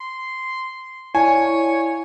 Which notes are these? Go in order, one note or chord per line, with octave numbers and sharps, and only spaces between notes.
C6
E4 C#5 D5 F5 G#5